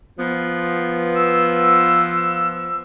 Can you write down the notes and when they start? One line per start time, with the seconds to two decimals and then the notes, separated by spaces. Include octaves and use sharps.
0.18 F3 B3
1.15 E6